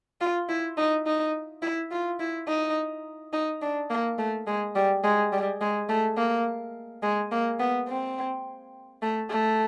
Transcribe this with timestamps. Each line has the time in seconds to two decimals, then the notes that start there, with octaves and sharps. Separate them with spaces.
0.21 F4
0.49 E4
0.77 D#4
1.06 D#4
1.62 E4
1.91 F4
2.20 E4
2.48 D#4
3.33 D#4
3.62 D4
3.90 A#3
4.18 A3
4.47 G#3
4.75 G3
5.04 G#3
5.32 G3
5.61 G#3
5.89 A3
6.17 A#3
7.03 G#3
7.32 A#3
7.60 B3
7.88 C4
9.02 A3
9.30 A3